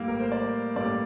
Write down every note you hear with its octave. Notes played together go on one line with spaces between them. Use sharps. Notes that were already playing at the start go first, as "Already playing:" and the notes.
Already playing: A2 G3 A#3
A#4
C5
D5
A2 G3 A#3 D5